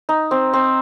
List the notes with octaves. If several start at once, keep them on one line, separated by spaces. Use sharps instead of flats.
D#4
C4
C4